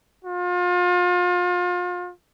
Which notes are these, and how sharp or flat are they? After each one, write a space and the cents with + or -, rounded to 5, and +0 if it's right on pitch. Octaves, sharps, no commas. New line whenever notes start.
F4 +35